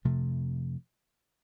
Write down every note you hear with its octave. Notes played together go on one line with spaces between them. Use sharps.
F2 C3 F3 A3